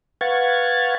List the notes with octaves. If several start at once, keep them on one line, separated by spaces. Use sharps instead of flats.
B4 F5 F#5 C#6 G#6 A6